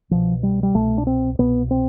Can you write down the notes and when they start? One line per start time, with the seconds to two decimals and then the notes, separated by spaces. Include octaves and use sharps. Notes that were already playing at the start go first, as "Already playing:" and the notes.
0.11 C2 B2 F3
0.43 G3
0.63 G3
0.75 C2 B2 A3
0.98 D4
1.07 C4
1.39 C2 B2 B3
1.71 C4